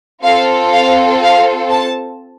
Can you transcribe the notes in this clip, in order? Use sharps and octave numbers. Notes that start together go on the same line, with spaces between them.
C4 F4 A4 F5
F5
F5
A5